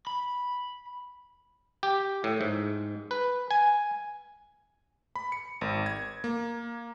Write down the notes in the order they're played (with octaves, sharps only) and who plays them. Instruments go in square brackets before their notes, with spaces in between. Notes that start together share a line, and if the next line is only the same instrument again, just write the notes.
[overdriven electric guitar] B5
[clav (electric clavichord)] G4
A2
G#2
B4
G#5
[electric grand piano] B5
C#7
G#1
G#6
A#3